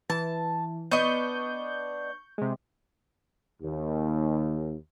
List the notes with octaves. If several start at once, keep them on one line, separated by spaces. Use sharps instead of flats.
E3 A5
B3 D4 D#5 C#6 G6
C3 G#3
D#2